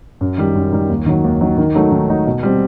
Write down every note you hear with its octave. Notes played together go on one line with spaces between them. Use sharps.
F#2
D#3 G3
F#2
D#3 G3
D#2
D#3 F#3
D#2
D#3 F#3
D#3
F#3 A3 D#4
D#3
F#3 A3 D#4
B2
G3 C4